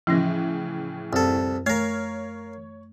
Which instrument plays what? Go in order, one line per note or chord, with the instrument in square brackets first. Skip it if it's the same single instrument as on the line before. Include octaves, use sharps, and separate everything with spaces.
[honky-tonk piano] A2 C#3 E3 [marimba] F3 C#4 A#6
[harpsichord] C2 A4 [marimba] F#2
[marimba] A3 [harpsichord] A#4 F5 [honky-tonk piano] C#5